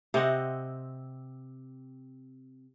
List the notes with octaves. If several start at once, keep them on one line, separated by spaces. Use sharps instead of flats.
C3 C4 D#5 F#5